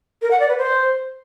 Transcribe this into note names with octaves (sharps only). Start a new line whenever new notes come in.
A#4
F#5
D5
B4
C5